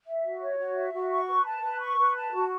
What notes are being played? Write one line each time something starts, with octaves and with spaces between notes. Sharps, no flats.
E5
F#4
C#5
F#4
E5
F#4
C#6
B4
A5
B4
C#6
B4
A5
F#4